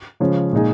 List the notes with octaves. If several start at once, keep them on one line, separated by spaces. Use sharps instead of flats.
C#3 F3 G#3 C#4
A#2 G#3 D#4 G#4